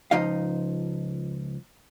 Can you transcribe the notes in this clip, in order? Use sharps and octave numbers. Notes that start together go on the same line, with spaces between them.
C#2 F3 D#4 D#5 F5